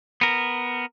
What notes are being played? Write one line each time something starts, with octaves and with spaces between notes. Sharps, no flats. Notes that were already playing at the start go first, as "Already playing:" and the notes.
B3 A#4